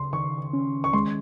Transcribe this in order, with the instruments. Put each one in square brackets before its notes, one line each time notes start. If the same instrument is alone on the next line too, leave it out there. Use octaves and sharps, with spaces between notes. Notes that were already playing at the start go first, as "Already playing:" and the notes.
Already playing: [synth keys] C#3 [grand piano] C6
[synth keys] D#3 [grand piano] C#6
[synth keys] C#4
[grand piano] C#6
[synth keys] G#3 [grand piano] C6